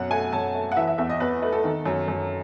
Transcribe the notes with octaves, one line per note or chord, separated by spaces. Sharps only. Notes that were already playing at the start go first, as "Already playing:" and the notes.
Already playing: F#2 B2 F#5
A3 G#5
F#2 A5
A3
F#5
E3 E5
E5
E2 E5
D#5
E2 B4
A3 B4
A4
D#3
F#2
F#2